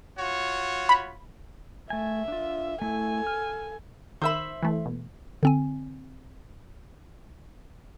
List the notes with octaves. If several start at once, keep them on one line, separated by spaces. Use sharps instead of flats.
F4 F#4 C#5
B5
A3 E5 G#5
D4 F4
A3 E4 A4 G#5
F6
D#3 C5 E5 B5 E7
E3 A3
B2
D3 C4 G#5